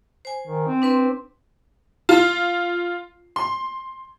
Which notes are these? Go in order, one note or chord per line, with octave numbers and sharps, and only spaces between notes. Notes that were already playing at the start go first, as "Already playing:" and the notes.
C5 G#5
D#3
C4
D4 B4 C6
F4
C6